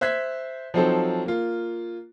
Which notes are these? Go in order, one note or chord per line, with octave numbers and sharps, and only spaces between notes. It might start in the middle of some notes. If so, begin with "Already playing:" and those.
C5 E5 F#6 G#6 B6
F3 F#3 C4 D#4 A4 C5
A#3 F4